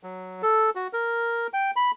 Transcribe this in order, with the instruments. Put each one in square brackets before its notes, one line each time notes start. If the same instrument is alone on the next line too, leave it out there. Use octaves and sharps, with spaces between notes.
[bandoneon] F#3
A4
F#4
A#4
G5
B5